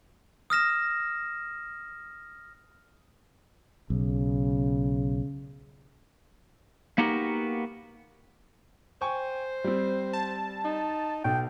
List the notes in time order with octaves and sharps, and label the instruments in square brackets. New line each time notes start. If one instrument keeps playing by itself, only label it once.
[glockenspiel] D#6 F6 A#6 E7
[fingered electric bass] B1 [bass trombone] C#3
[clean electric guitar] A#3 B3 D#4 F#4 G4 A#4
[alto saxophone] C5 [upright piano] G5 G#5 C#6
[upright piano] G3 C4
[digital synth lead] A5
[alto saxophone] D#4
[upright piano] B1 [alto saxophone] G5